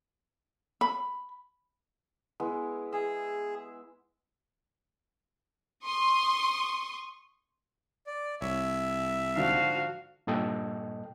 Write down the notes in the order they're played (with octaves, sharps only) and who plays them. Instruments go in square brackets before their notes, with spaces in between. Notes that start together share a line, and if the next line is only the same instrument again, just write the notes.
[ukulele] B5
[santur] G#3 B3 E4
[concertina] G#4 [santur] E5
[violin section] C6 C#6 D#6
[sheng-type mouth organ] D5
[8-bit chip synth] C2 [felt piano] C#5 [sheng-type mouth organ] E5
[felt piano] G#2 D3 F3 [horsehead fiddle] F#4 F5
[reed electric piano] G2 A#2 A4 D#5 G5